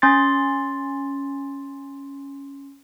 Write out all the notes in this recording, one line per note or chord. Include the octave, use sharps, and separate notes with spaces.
C#4 C6 A6